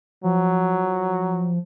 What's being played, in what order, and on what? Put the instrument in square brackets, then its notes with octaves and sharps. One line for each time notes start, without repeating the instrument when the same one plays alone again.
[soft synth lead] F3 [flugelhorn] F#3